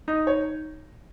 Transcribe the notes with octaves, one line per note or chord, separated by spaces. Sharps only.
D#4 D#5
C#5